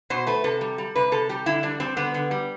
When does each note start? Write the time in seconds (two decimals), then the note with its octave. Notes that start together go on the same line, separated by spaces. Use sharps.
0.10 B2 C5
0.27 A3 B4
0.44 C3 A4
0.61 G3
0.78 G3
0.95 C3 B4
1.12 C3 A4
1.29 G3 G4
1.46 D3 E4
1.63 G3 D4
1.80 G3 C4
1.97 D3 B3
2.14 D3
2.31 G3